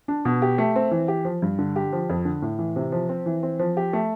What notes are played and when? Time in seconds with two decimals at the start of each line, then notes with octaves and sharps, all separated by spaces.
0.08 D4
0.25 B2
0.42 G4
0.58 A3
0.76 C4
0.91 E3
1.08 G4
1.25 F3
1.42 G2
1.59 D3
1.76 G4
1.93 F3
2.10 F2
2.25 D3
2.42 A2
2.59 E3
2.76 C3
2.92 F3
3.09 C4
3.26 E3
3.43 C4
3.59 F3
3.77 G4
3.93 A3